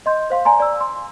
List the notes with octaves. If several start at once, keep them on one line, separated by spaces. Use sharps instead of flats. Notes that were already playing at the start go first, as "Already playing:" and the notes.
D#5 C6 G6
C5 F5 C6
D5 G#5 A#5 C6
D5 E6
C6